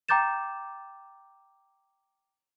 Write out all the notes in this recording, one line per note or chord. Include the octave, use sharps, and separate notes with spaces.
G5 A#5 D6 G6 A6 E7